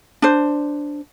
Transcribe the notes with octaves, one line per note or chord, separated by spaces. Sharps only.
D4 C5